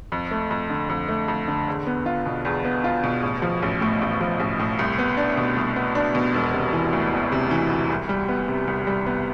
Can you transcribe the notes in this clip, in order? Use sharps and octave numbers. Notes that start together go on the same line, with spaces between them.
F2
A3
F2
D3
F2
A3
F2
D3
E2
B3
F4
B2
E2
B3
F4
B2
A1
F3
A1
A2
A1
F3
A1
A2
C2
B3
D4
B2
C2
B3
D4
B2
E1
C3
E3
D2
E1
C3
E3
D2
C2
G3
B3
C3
C2
G3
B3